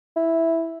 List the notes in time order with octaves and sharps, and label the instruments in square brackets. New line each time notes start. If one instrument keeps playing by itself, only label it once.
[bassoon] E4